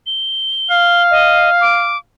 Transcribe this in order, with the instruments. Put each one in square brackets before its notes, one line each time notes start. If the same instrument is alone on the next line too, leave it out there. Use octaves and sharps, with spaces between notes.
[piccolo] G7
[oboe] F5
[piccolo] D#5
D6